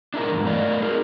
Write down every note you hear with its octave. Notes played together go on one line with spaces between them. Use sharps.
D4 E4 A4 A#4
E2 G#2
A3 A#4 D5 D#5 F5
D#4 G#4 A#4